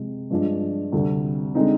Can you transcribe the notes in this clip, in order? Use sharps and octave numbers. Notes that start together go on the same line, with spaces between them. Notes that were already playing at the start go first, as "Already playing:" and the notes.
Already playing: C3 F3 G#3
G2 F3 G#3 D4
D2 C3 G3 C4
D3 G#3 C4 D#4